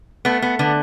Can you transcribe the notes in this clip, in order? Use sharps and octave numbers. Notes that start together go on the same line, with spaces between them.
A3 B3
B3
D3 B3